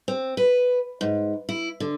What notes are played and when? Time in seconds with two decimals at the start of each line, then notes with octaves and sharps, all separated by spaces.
0.08 C4
0.37 B4
1.01 G#2
1.49 E4
1.80 D3